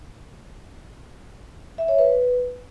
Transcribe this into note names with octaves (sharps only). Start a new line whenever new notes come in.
E5
C#5
B4